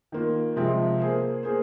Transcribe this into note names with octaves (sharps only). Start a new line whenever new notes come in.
D#3 A#3 F4
C3 F3 G#3 C4 F4
A#3 G#4 C5
A#3 G#4 C5